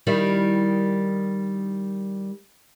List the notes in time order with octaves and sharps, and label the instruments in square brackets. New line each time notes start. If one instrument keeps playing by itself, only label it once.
[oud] D#3 G3 E4